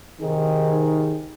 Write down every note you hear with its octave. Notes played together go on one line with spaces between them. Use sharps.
C3 D#3 D#4 G#4